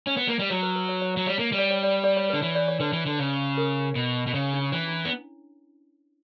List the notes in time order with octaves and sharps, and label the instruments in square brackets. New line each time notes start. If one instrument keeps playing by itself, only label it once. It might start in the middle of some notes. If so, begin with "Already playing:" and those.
[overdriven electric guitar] C#4
B3
A#3
G3
[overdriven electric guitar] F#3 [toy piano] C#5
[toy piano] B4
B4
C#5
C#5
[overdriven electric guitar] F#3 [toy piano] C#5
[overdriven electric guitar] G3 [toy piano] C#5
[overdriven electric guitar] A#3
G3
[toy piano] D5
C#5
D5
D5
C#5
[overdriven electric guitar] D3 [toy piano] B4
[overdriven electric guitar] E3 [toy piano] C#5
[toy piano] D5
C#5
[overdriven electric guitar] D3 [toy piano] B4
[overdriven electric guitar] E3
D3
C#3
[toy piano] A#4
[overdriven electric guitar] B2
B2
[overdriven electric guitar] C#3 [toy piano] C#5
[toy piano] D4
[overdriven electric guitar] E3 [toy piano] C#4
[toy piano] E4
D4
[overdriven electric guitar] B3